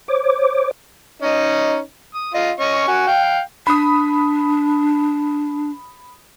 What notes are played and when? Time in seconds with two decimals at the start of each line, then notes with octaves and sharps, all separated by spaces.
0.08 C5 C#5 D6
1.22 C#4 D#4 D#5
2.15 D#6
2.34 F4 D#5
2.60 C#4 D#5 C#6
2.88 F#4 G#5
3.07 F5 G5
3.67 D4 B5 D#6